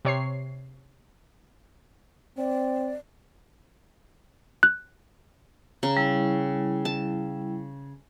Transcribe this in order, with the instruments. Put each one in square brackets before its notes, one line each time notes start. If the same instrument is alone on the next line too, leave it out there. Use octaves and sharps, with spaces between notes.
[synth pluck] C3 C#5 C7
[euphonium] C4 [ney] D5
[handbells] F#6
[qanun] C#3 [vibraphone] A#5
[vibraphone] G3 E4
[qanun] A5